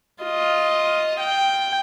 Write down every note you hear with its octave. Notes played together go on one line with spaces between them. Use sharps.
F4 D#5
G5